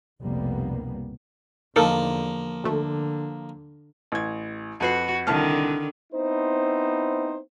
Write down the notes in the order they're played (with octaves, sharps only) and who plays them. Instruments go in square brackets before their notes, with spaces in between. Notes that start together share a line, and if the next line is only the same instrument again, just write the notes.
[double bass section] F1 C2 B2 G3 A#3 B3
[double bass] E2 D3 [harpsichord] F3 A#3 [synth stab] D#4 A4 A#4
[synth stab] D2 A3 [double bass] D3
[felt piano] A1 G#6
[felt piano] F2 B4 C7 [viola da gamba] F#4
[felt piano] C2 A5 F6 [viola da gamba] D3 D#3
[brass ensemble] B3 C4 D#4 E4 C5